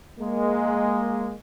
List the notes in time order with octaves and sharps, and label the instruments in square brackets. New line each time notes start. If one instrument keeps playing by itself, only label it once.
[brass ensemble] G#3 A#3